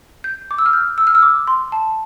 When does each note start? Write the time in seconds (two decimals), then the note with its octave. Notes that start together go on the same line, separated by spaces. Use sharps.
0.24 G6
0.51 D6
0.58 E6
0.66 F6
0.73 G6
0.98 E6
1.07 F6
1.15 E6
1.22 D6
1.47 C6
1.72 A5